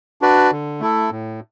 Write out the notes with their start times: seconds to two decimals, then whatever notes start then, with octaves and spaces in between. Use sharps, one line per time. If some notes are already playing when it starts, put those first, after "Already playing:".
0.21 D4 F#4 B4 D5
0.52 D3
0.80 A3 E4 A4
1.11 A2